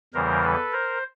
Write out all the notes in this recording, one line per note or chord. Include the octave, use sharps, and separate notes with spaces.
E2 C#3 E3 G3 A#4 C5
A4 B4
A#4 C5